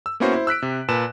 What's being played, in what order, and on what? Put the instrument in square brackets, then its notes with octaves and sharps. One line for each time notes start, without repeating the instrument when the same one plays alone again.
[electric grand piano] E6
A#3 B3 C#4 E4 F#4 C5
E4 C5
E6 F#6 B6 D7
C3
A#2 B4 A5 E7